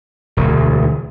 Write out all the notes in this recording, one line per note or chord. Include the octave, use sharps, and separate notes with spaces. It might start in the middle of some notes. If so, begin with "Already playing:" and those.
E1 D2